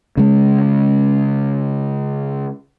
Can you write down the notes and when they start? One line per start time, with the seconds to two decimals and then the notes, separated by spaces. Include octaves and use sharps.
0.17 C#3 G#3